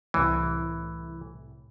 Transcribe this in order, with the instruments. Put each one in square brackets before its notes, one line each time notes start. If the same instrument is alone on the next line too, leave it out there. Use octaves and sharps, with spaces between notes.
[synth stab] C2 A2 [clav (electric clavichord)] E3